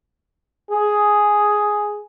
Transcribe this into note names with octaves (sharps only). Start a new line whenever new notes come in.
G#4